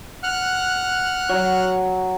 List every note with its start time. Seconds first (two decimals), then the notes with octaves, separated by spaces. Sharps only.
0.23 F#5 F6 F#6
1.29 F#3